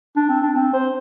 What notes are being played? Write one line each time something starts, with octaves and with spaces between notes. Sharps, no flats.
D4
C4
D4
C4
C5